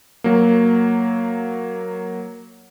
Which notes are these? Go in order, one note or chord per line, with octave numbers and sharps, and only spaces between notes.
F#3 A#3